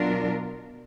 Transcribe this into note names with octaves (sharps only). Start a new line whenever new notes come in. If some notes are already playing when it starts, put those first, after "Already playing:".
Already playing: B2 F#3 D4 F4 A#4